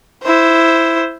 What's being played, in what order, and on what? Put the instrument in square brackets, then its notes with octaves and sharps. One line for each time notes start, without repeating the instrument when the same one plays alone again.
[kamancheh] E4 C5